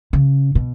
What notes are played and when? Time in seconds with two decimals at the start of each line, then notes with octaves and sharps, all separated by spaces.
0.13 C#3
0.55 B2